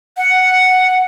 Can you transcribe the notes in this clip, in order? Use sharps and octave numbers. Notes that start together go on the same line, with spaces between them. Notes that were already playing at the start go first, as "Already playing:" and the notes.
F#5